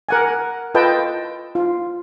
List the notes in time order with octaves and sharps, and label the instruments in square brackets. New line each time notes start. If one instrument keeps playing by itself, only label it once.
[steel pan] A#4 F#5 G#5
F4 A4 B4 D#5 G5 A5
F4